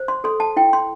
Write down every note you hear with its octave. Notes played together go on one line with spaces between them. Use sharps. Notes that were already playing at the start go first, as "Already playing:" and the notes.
Already playing: C5
C6
A4 C6
A5
E4 G5
C6